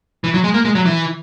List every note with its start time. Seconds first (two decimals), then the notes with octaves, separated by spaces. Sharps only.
0.24 E3
0.34 F#3
0.44 G#3
0.54 A#3
0.65 G#3
0.75 F#3
0.86 E3